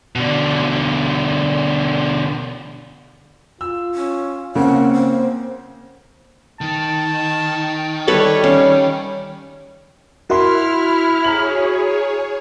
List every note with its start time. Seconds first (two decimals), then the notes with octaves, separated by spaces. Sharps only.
0.16 B2 D3
3.61 F4 E6
3.94 C#4
4.55 C#3 A#3 C4 F#5
4.93 C5
6.61 D#3 A5
8.08 G3 A4 B4 C#5
8.44 C#4 F5
10.30 E4 F#4 A#4 E5 C6 F6
11.24 G#4 C#5 A#5 F6 F#7